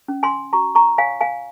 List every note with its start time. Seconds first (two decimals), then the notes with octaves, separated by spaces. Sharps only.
0.08 C#4
0.23 G#5 C6
0.53 F#4 A#5 C#6
0.75 A#5 C#6
0.98 C#5 F5 G#5
1.21 F5 G#5